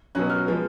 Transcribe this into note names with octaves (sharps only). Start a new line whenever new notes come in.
B2 F#3 C#4 F#6
F6
F3 G#3 B3